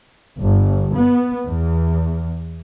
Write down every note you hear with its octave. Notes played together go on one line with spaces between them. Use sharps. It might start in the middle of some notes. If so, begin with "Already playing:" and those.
G1
B3
E2